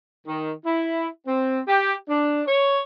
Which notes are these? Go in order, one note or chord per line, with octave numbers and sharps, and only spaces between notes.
D#3
E4
C4
G4
D4
C#5